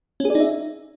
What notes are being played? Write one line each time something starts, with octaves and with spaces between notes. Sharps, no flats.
C#4
G#4
D5
D#4
E5